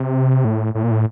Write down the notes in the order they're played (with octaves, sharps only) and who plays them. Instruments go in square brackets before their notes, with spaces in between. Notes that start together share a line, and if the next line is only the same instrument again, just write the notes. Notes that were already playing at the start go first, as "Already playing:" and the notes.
Already playing: [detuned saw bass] C3
A2
A2
A#2
A2